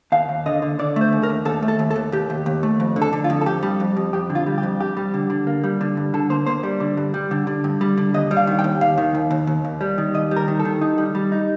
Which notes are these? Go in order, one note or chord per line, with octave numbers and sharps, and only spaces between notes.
D#2 F5
D#2
D3 D#5
D3
D3 D5
A3 C5
D#2
A#4
D#2
D#2 A4
A3
A4
D#2
A4
D#2
D#2 G4
D#2
D#2
A3
F2
D3
A4
D3
F4
F2
A4
F2 G4
G3
F2
F2
F2 G4
D3
F4
G3
G4
F2
F2 G4
G3
D3
D3
A#3
G3
D3
G2
D3 A4
A#3 C5
A#3 C5
G3
D3
G2
G3
D3
D3
G2
G3
D3
D#2 D#5
G3
F5
D#3
G5
D#2
D#2 F5
D#3
D#2
D#2
D#2
D#2
G3
D#3
D#2 D#5
G3
A#4
D#3
A4
D#3
D#4
G3
G3
D#4